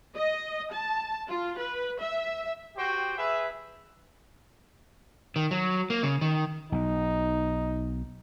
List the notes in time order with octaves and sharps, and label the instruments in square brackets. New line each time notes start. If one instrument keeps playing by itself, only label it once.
[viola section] D#5
A5
F4
B4
E5
[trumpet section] F#4 G4 C5 G5
G#4 B4 E5
[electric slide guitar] D#3
F#3
A#3
C#3
D#3
[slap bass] B1 B2 [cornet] D#4